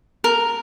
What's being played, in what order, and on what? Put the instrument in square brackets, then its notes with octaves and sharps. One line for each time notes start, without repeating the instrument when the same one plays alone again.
[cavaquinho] A#4